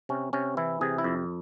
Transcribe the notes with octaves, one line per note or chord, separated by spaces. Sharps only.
C3 C#4
C3 C#4
E3 E4
C3 G#4
E4
F2